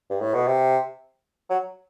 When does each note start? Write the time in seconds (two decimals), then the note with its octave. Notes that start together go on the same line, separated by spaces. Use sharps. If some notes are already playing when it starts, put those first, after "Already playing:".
0.10 G2
0.21 A2
0.34 B2
0.47 C3
1.50 F#3